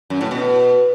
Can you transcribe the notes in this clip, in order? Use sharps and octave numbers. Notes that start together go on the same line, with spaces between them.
F#2
A2
B2